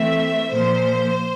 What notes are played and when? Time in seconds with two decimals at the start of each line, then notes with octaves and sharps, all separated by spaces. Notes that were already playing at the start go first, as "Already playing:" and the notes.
Already playing: E3 A3 C4 E5
0.50 A#2 F3 A#3 C5